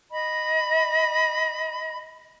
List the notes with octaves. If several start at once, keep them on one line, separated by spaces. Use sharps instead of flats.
D#5 B5